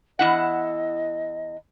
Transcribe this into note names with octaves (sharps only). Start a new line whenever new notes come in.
E2 E4 D#5 F#5